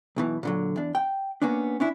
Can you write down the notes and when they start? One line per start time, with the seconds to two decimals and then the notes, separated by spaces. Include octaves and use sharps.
0.16 B1 B2 E3
0.43 A#2 D3 F#3
0.76 E2 D4
0.95 G5
1.42 A#3 B3 C#4 D4
1.80 C#4 D4 E4